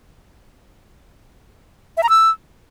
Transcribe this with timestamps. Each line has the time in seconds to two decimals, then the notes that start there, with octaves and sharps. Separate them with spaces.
1.97 E5
2.03 A#5
2.09 E6